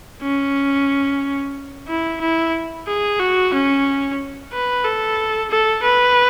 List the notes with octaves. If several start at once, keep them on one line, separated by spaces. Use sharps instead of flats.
C#4
E4
E4
G#4
F#4
C#4
B4
A4
A4
B4